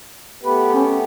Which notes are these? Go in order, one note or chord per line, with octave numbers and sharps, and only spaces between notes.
A3 B3 G4 B4
C#4